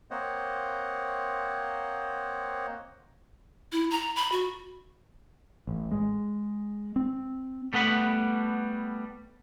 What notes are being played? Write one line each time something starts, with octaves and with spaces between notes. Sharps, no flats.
A#3 C4 C5 C#5 D#5 F#5
E4
A#5
B5
F#4
A1
G#3
C4
G3 A3 B3 F#5 B5